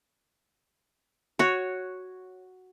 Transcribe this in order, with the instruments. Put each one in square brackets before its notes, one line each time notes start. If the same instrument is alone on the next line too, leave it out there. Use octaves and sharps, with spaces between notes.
[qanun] F#4 C#5